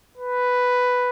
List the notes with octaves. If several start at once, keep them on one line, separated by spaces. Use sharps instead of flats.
B4